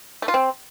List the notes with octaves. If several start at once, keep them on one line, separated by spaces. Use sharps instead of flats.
A3
F4
C4